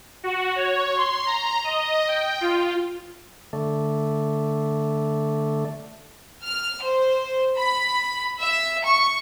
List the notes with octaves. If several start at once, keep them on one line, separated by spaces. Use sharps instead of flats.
F#4
C#5
C6
A#5
D#5
G5
F4
D3 A3
F6
C5
B5
E5
C#6